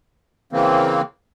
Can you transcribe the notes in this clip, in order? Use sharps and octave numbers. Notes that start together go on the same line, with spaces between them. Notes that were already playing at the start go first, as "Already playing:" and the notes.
C#3 E3 A#3 C4